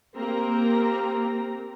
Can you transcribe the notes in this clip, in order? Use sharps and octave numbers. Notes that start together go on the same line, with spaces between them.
A#3 C4 G4 A#4 A#5